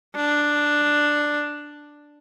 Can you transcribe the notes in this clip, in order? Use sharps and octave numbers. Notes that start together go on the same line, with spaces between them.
D4